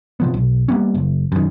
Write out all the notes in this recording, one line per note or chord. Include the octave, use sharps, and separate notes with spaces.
C3 F3 B3
B1
G3 A#3 B3 C#4
F#1
F#2 D#3